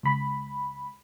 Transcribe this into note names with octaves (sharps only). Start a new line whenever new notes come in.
C#2 B5